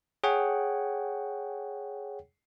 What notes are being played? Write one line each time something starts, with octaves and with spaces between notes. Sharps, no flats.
G#4 C#5 F#5 G5